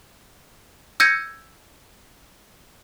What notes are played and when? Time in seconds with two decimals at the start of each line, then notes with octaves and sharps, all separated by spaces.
1.00 E6 G6 G#6 A#6 C#7 D#7